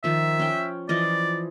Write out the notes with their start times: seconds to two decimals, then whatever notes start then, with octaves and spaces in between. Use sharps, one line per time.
0.04 D#3 F3 E5
0.39 C#4 G5
0.89 E3 F3 D5 D#5